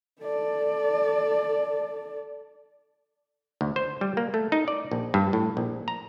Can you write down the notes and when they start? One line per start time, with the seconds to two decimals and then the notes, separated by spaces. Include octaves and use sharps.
0.22 A4 D5
3.61 D2
3.76 C5
4.01 G3
4.17 A#3
4.34 A3
4.52 D#4
4.68 D5
4.91 A#1
5.14 G2
5.33 A2
5.57 A#1
5.88 A#5